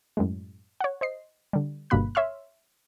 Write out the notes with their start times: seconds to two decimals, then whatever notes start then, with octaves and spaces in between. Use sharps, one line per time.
0.17 F#2 A2 G#3
0.81 C#5 F#5
1.01 C5 D#5 C7
1.53 D3 G3
1.90 G1 G2 B2 A#3 B5 F#6
2.15 C#5 E5 C6 E6 F6